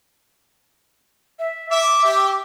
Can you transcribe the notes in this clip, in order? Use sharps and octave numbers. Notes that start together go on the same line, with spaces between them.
E5
E5 D6
G4 E5